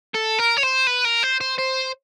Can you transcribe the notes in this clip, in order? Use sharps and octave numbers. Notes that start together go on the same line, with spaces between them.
A4
A#4
C#5
C5
B4
A#4
C5
C5
C5